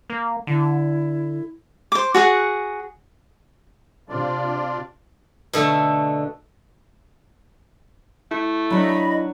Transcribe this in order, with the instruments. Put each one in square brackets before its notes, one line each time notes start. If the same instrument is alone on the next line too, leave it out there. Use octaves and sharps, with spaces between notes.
[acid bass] A#3
[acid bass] D3 [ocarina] E4
[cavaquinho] C5 D6
F#4 G#4 F#5
[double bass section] C3 [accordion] D4 F4 D5
[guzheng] B2 D3 A3
[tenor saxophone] A3 [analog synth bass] E4
[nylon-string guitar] F#3 D4 [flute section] D#5 B5